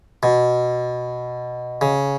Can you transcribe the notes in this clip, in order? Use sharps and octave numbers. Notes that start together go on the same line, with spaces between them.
B2
C#3